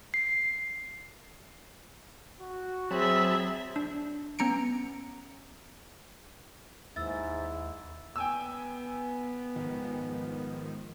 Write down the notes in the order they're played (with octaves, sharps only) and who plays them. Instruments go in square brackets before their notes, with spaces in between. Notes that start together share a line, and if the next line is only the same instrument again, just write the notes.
[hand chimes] C7
[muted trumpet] F#4
[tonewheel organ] F#3 A5 B5 [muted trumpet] C4 [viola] G#4 E5
[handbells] D4
B3 C#4 A#5 C#7 D7
[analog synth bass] D#2 [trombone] G#2 [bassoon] E4 [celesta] E6 A6
[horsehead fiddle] B3 [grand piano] G5 G#5 E6
[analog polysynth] G#2 D#3 F3